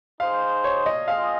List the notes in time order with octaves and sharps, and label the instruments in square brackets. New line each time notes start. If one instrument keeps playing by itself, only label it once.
[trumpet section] D#4 G#4 C5 [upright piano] F5
[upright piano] C#5
D#5
[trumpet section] G#3 C4 F4 G#4 D#5 [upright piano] F5